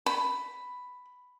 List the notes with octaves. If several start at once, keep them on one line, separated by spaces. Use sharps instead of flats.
B5